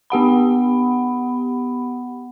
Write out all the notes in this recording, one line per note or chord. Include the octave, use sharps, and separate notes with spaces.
B3 G4 F#5 B5